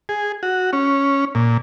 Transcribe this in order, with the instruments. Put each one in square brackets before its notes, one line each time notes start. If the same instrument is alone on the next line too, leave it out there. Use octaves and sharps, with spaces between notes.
[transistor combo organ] G#4
F#4
C#4
A#2